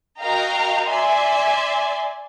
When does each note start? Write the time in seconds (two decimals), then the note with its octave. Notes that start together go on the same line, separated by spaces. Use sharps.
0.20 F#4 A#4 D#5 F5 G5 A#5
0.88 D5 E5 G#5 C6